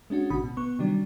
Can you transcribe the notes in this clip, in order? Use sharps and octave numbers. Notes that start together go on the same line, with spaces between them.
G#3 C#4 D4 F#4
A1 B2 D3 F#4 B5 D#6
B2
B3 C#6
C3 D#3 F#3 G3 D4